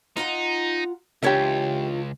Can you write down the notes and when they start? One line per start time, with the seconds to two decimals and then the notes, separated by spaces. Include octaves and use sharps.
0.17 D#4 F4 F#5 A#5
1.23 C#2 E3 D4 F4 G4 C#5 E5